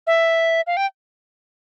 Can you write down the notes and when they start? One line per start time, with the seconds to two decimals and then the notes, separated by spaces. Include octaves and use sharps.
0.07 E5
0.67 F5
0.77 G5